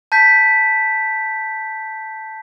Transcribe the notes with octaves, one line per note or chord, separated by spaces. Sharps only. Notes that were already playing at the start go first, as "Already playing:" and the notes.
A5 G6 B6